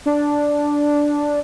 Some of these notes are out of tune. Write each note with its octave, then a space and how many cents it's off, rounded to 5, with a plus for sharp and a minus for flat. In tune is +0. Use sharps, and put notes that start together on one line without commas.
D4 -5